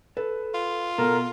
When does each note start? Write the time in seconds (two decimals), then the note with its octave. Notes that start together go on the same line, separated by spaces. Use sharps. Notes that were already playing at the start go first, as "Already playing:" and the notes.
0.17 A4 B4
0.54 F4
0.98 B2 A4 A#4 F#5